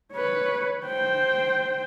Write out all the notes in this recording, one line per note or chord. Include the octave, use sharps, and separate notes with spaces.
B4 C#5
C5 G5